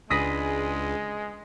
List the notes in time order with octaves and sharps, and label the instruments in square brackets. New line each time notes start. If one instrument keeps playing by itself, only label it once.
[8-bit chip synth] C#2 [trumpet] G#3 [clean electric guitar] D4 G#4 B4 [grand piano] D#6 A#6 B6